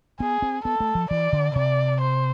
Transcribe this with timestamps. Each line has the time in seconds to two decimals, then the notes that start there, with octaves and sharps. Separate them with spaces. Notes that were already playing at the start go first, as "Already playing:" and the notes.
0.20 B3 G#4
0.42 C4
0.65 B3 A4
0.80 A3
0.95 F3
1.11 E3 D5
1.33 D3
1.55 C3 D5
2.01 C5